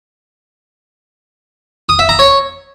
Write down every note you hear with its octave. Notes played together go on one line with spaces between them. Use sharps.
D#6
E5
A#5
C#5